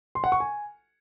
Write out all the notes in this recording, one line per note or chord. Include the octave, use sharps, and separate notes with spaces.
C6
F#5
C#6
G#5